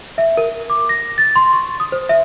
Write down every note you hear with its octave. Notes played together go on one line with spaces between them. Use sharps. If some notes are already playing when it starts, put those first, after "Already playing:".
E5
A#4
D6
A#6
A6
C6
C#6
D#6
C5
E5